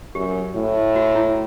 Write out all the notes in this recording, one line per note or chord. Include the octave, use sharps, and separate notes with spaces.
F#2 G4
A2
F#4
E4